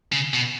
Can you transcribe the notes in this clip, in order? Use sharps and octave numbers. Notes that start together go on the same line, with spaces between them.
C#3
B2